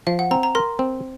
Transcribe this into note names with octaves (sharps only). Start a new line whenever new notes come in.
F3 F5
F#5
C4 A#5
A#5
A#4 C6
C4